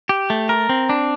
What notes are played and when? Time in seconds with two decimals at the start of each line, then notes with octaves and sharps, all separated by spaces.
0.09 G4
0.30 A3
0.49 A#4
0.69 C4
0.89 D4